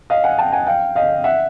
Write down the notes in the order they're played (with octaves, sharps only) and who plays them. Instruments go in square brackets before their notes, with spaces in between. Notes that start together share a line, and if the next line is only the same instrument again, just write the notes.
[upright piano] D#5 F5
F#5 G#5
G5 A5
F#5 G#5
F5 G5
D#5 F5
E5 F#5